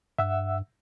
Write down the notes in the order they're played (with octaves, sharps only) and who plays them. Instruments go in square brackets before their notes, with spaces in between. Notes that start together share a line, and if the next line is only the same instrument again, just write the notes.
[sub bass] G2 [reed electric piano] E5 F#5 E6